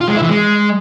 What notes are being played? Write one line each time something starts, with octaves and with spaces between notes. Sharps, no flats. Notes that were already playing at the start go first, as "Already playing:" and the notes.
F4
G#3
E4
E3
G#3